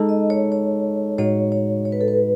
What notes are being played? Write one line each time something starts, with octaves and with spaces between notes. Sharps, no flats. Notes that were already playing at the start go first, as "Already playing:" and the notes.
Already playing: G#3 D#4 A4
D#5
C#5
C#5
A2 G#3 D#4 F#4 C#5
C#5
C#5
B4
A4
B4